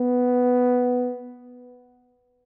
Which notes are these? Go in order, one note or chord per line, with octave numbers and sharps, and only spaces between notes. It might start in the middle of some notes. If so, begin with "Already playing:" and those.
Already playing: B3